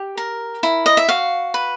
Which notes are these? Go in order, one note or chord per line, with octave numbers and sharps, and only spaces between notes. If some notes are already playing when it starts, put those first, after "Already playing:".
Already playing: G4
A#4
E4
D#5
E5
F#4 F5
B4